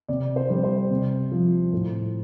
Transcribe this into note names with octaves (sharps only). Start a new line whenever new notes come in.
C3 D5
C5
G3
C5
C3
F3
A2